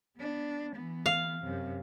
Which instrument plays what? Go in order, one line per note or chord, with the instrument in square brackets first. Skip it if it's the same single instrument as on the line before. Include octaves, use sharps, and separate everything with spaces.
[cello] B3 D4
E3 B3
[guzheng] F5
[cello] F#2 C3